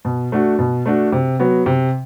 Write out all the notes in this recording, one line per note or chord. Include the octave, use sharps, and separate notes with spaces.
B2
A3 D4 F#4
B2
A3 D4 F#4
C3
F#3 B3 F#4
C3